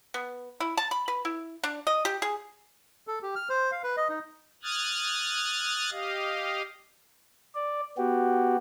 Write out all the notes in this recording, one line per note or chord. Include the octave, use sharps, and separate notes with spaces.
B3
E4
A5
B5
B4
E4
D4
D#5
G4
G#4
A4
G4
F6
C5
F5
B4
D#5
D#4
D#6 F6 F#6 G#6 A6
G4 D#5 F5
D5
B3 F#4 G4